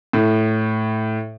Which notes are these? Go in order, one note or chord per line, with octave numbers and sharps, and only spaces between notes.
A2